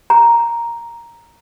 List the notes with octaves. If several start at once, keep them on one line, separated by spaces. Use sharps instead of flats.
A#5